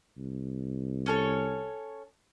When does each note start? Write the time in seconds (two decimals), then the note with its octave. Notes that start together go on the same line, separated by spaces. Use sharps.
0.18 C2
1.06 C#4 A4 C#5